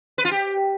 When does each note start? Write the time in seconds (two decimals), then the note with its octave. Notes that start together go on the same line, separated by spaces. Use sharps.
0.18 B4
0.25 F4
0.31 G4